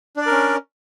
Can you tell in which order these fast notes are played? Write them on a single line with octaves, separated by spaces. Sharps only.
D4 D5 A#4 C#4